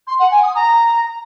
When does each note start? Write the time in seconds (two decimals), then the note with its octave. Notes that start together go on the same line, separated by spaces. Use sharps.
0.07 C6
0.19 F#5
0.31 G#5
0.42 D#6
0.54 A#5